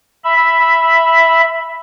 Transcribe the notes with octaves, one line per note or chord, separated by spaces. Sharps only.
E5 B5